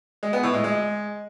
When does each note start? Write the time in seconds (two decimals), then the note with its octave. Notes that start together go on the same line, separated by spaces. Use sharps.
0.23 G#3
0.33 B3
0.43 A2
0.54 G#3
0.64 G#3